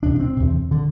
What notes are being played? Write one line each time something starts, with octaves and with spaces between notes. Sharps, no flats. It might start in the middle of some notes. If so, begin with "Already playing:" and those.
E2 C3 D4
D4
C4
E2 C3
D3